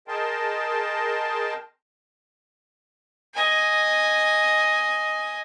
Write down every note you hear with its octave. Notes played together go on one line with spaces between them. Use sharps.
G#4 A#4 D#5 G5 A5 C6
D#5 G#5